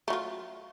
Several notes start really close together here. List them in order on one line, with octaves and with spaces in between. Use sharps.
A3 F#3 F4